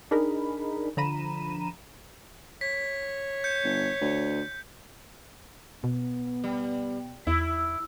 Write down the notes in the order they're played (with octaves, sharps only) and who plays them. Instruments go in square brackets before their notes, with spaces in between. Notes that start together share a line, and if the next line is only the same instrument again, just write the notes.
[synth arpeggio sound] D4 D#4 G#4 A#4 B5
D3 F3 A#5 B5 D#7 E7
[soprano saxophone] C#5 [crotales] B6
[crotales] G6 C#7
[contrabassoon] G1
D2
[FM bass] B2 [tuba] B3
[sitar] G3
[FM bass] E2 [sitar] E4